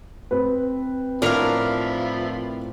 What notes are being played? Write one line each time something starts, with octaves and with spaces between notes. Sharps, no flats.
C4 B4
A2 F3 D4 E4 F4 A#4 F5